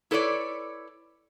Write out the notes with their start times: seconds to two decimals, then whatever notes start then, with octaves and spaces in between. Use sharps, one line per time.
0.11 E4 A4 B4 C#5 D5